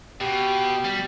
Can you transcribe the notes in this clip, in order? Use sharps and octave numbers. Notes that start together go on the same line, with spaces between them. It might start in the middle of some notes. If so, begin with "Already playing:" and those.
B2 G4
G3